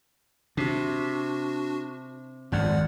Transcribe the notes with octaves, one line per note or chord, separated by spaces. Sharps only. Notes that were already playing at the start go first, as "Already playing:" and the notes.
C3 D4 F#4
G#1 F2 A2 D5 F#5